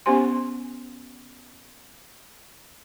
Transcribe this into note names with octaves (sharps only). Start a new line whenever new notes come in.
B3 C#4 G4 C5 G#5 C6